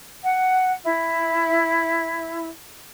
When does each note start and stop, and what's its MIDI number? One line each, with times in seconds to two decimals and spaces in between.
0.22 0.72 78
0.84 2.46 64